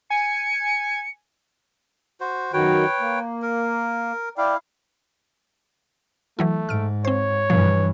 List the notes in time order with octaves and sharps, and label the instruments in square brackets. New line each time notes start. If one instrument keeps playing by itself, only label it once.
[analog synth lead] G#5 [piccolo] C#7
[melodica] F#4 C5
[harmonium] F#2 D#3 F#4 [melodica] B4 C#5 G5
[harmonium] A#3
[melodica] A#4
[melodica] E4 F5 [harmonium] D5 G5
[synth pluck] E3 F#3 E4 [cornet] A3
[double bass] G#2 [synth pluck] F6 D7
[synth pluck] C4 C5 [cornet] C#5
[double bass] G2 E3 [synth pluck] B2 F3